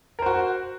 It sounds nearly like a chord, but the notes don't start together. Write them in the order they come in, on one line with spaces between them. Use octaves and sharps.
A#4 C5 F#4